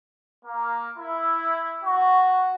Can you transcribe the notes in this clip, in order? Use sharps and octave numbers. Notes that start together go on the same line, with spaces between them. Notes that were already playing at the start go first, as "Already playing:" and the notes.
A#3
E4
F#4